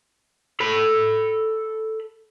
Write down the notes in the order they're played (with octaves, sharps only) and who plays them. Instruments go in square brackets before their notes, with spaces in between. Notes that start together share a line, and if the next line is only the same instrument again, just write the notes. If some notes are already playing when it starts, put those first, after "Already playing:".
[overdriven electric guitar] A4 B5